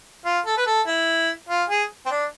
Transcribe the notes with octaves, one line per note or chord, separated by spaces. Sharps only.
F4
A4
B4
A4
E4
F4
G#4
C4
D4